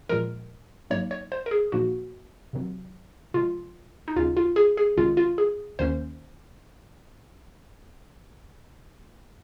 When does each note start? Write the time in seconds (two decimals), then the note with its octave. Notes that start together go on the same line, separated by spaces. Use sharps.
0.09 A#2 F3 G#3 A#4
0.90 G#2 F#3 A#3 D#4 C#5
1.11 C#5
1.32 C5
1.46 A#4
1.51 G#4
1.72 A#2 F3 A#3 D#4 F#4
2.53 C3 D#3 F#3 C4
3.34 C3 F3 G#3 F4
4.08 D#4
4.16 D#2 C#3 G#3 C#4 F4
4.37 F4
4.56 G#4
4.77 G#4
4.97 C2 C3 D#3 G#3 C#4 F4
5.17 F4
5.38 G#4
5.79 D#2 D#3 A#3 C#4 C5